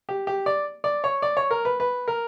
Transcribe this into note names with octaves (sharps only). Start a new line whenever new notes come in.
G4
G4
D5
D5
C#5
D5
C#5
A#4
B4
B4
A#4